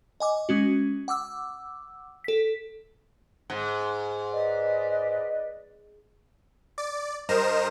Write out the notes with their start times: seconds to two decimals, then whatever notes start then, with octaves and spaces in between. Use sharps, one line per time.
0.20 D#5 G#5 D6
0.49 G#3 C#4 F#4
1.08 F#5 D6 E6
2.24 A4 B6
3.50 G#2
4.31 B4 D5 D#5
6.78 D5
7.29 G2 A#4 C5 D#5 A#5 E7